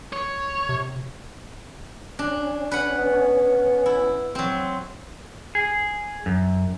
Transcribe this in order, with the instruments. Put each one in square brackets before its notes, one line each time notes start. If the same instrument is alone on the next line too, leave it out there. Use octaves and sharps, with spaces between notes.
[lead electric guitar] C#5
[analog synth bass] C3
[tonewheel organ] C#4 [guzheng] D4
[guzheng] B4 F#5
[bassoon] B3
[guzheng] E4
F#3 C4
[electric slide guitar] G#4
F#2